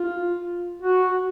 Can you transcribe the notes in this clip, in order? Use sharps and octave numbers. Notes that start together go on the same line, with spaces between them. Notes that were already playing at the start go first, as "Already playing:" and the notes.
Already playing: F4
F#4